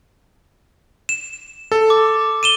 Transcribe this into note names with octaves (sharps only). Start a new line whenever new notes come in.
E7
A4
D6
D#7 E7 G7